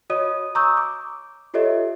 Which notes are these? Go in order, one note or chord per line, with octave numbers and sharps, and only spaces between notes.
F#4 C#5 D#5 D#6 D#7
A#5 C#6 D#6 E6 G6
D6
F4 G4 A4 C#5 D#5 E5